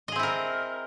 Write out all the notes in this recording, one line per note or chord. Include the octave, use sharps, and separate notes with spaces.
C4 E4 G#4 A#4 D#5